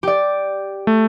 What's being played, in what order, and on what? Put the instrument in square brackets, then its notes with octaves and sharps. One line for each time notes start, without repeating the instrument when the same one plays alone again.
[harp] G4 D5
[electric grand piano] A3